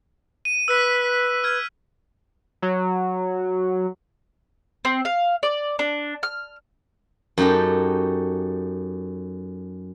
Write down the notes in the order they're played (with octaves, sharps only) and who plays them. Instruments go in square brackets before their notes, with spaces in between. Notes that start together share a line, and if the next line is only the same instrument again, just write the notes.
[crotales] D#7
[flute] B4 [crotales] E6 F#6 B6
[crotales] F6 G#6
[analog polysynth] F#3
[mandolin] C4
F5
D5
D4
F6
[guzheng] F#2 D#4 G4 A4